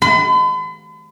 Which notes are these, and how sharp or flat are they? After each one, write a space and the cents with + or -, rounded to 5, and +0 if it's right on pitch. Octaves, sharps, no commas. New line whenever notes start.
B5 +45